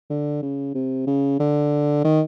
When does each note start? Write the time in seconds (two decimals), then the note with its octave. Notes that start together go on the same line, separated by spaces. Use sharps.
0.10 D3
0.42 C#3
0.75 C3
1.07 C#3
1.40 D3
2.04 D#3